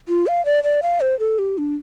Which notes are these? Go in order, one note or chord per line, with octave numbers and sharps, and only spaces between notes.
F4
F5
D5
D5
F5
C5
A4
G4
D4